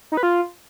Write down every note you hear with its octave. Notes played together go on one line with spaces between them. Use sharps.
D#4
B4
F4